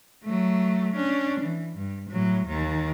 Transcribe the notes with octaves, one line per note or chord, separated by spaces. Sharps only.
F#3 A3
C#4 D4
E3
G2
A2 F#3
D#2 D#3